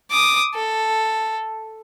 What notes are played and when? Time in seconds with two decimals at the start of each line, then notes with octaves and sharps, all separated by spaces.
0.11 D6 D#6
0.54 A4